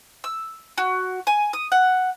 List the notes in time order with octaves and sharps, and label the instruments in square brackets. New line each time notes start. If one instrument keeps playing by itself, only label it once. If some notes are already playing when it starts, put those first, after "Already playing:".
[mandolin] E6
F#4
G#5
D#6
F#5